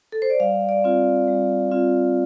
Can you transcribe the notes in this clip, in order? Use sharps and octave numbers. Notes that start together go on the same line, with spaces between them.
A4
C5
D5
G3 F5
D5
C4 F4
G3
C4 F4